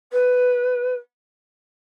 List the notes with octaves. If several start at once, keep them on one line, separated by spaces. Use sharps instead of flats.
B4